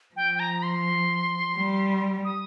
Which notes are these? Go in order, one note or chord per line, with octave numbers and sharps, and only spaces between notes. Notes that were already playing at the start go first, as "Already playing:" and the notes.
F3 G5
G5
A#5
A#5
C6
G3
D#6